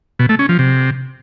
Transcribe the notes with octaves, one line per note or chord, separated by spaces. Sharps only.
B2
A3
C#4
F3
C3